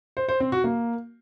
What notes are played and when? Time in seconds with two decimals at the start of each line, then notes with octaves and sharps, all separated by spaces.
0.17 C5
0.28 C5
0.40 C4
0.52 F#4
0.64 A#3